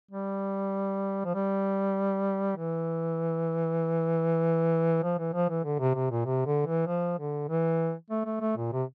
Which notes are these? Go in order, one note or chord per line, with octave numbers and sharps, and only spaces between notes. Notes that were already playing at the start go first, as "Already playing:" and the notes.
G3
F3
G3
E3
F3
E3
F3
E3
D3
C3
C3
A#2
C3
D3
E3
F3
D3
E3
A3
A3
A3
A#2
C3